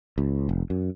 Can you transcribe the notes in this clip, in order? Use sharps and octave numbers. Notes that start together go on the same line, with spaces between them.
C#2
F1
F#2